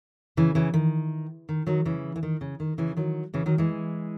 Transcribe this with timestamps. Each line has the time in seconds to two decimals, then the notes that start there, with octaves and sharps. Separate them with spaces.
0.37 C#3 E3
0.55 C#3 E3
0.74 D#3
1.49 D#3
1.67 D#3 F#3
1.85 C#3 E3
2.16 E3
2.23 D#3
2.41 C#3
2.60 D#3
2.78 C#3 E3
2.97 D#3 F#3
3.34 C#3 E3
3.46 D#3 F#3
3.58 E3 G#3